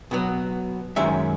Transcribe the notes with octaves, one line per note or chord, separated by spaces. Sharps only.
B2 F#3 B3
F#2 D#3 G#3 C#4 E5